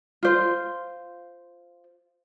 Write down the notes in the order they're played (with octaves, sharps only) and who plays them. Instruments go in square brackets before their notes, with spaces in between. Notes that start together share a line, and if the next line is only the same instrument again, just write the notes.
[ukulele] F4 C5